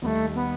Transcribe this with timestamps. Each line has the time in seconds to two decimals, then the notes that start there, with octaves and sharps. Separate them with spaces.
0.02 D#2 D#3 G3 A3 B3
0.35 B3